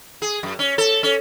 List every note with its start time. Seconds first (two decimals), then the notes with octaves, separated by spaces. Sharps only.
0.22 G#4
0.43 F#2
0.59 C#4
0.78 A4
1.03 C#4